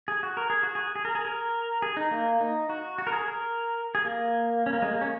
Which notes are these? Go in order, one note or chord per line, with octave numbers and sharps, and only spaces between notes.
G#4
F#4
A#4
G#4
F#4
G#4
G#4
A#4
G#4
A#4
G#4
D#4
A#3
D#4
F#4
F#4
A#4
G#4
A#4
G#4
A#3
C#4
A#3
G#3
A#3
C#4